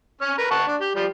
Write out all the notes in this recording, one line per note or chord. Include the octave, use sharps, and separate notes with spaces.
C#4 C#5 F6
A#4 B4
F#5 A5 C#6
D4
G4
F3 G3 G4